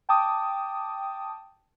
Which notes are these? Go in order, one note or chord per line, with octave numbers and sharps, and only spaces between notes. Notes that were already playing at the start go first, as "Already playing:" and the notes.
G5 A5 D6 D#6